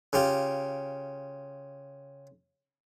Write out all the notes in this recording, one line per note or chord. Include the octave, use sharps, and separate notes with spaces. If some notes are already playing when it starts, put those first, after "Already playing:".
C#3 F4 G4